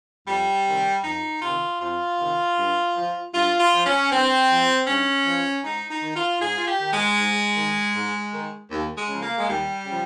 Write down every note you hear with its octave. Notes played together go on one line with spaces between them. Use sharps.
F2 G3
C3 D#3
F2 D#4
C3 D#3 F4
F2 F4
C3 D#3
G2
F3
G2 F4
F4
F3
C#4
G2 C4
F3
G2 C#4
F3
G#2 D#4
D#4
D#3
F4
G#2 G#4
F4
G4
D#3
G#3
G#2
D#3
G#2
D#3
D#2
G#3
C#3 F3
A#3
G#3
D#2 G3
C#3 F3